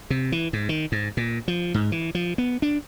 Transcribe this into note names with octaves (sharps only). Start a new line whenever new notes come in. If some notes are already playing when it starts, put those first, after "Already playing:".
C3
E3
G#2
D#3
G#2
A#2
F3
G#2
E3
F3
B3
D4